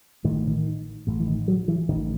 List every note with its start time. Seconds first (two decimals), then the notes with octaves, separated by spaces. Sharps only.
0.24 A1 A2 D#3
0.47 D#3
1.07 A1 A2
1.20 E3
1.27 D#3
1.48 F#3
1.68 E3
1.89 A1 D#3
1.92 A2